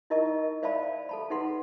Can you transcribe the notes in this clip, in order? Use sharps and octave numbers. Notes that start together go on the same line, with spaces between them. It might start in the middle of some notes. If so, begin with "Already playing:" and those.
D#4 E4 A#4 D#5 A5 C#6
C5 D5 E5 F5 A5 B5
A4 A5 B5
D#4 G#4 B4 F#5 C6